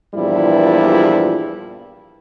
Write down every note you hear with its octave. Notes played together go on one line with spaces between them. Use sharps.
E2 G2 A#2 F3 G3 E4